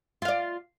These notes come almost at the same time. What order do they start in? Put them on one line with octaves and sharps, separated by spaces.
F4 F5 D5